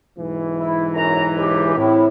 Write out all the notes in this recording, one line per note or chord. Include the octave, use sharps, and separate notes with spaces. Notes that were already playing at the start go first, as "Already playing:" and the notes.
B1 G#2 E3
E4
F#2 A#5
C#2 G4
A2 C4 E4